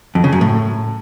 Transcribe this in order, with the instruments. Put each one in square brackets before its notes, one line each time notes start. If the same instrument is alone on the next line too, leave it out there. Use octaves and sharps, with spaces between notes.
[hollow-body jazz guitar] F2
C#3
F#2
A2